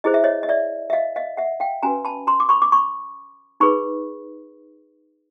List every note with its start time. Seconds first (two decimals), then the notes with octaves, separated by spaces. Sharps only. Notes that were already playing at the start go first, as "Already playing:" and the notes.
0.04 E4 G#4 C5 D#5
0.14 E5
0.24 C#5 D#5
0.43 D#5
0.49 D5 E5
0.90 E5
0.93 D#5 F5
1.16 D#5 F5
1.37 E5 F#5
1.60 F5 G5
1.83 C#4 F#4 B4 G#5 A#5
2.05 A5 B5
2.27 A#5 C6
2.40 D6
2.49 B5 C#6
2.62 D6
2.72 B5 C#6
3.60 D#4 G#4 B4 B5 C#6